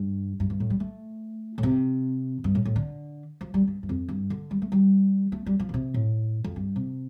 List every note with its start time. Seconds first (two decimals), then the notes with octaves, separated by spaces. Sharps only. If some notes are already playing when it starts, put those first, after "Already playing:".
Already playing: G2
0.40 G2
0.50 G2
0.60 A2
0.70 G3
0.80 A3
1.58 A2
1.63 C3
2.44 G2
2.55 A2
2.65 A2
2.76 D3
3.41 F3
3.54 G3
3.68 G2
3.83 G2
3.89 F2
4.09 G2
4.30 D3
4.51 G3
4.62 A3
4.72 G3
5.32 A3
5.46 G3
5.60 F3
5.69 D3
5.74 C3
5.94 A2
6.44 F2
6.56 G2
6.76 C3